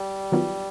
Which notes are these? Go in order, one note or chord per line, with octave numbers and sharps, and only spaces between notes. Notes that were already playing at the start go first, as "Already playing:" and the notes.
Already playing: G3
D#3 F#3 B3 D4 F4